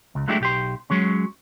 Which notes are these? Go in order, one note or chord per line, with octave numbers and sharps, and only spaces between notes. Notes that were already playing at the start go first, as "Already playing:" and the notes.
C#2
F#3 G#3 A3 D4 E4 G4
B1 G4 C6
F#3 G#3 C#4